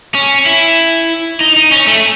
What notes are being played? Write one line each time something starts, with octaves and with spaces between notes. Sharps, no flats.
C#4
E4
D#4
D#4
C#4
A3